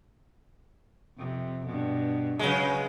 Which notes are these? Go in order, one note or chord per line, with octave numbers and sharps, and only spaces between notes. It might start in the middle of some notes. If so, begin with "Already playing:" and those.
F2 C3
G2 B2
C#3 F#3 G#3 B4